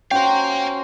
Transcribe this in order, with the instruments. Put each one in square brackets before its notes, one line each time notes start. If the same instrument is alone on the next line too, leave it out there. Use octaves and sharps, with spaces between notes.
[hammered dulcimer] C#4 F#4 C5 [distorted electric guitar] F5 A#5 [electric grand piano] G5